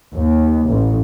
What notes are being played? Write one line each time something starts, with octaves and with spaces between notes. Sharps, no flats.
D#2
A1